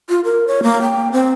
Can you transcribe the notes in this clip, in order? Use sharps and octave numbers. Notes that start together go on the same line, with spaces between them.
F4
A#4
C#5
A#3
G5
C4